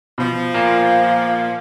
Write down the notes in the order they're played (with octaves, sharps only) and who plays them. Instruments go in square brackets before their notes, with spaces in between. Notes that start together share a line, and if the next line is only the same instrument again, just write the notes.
[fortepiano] B2 [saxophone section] F3
[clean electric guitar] A#2 A#3 [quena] F5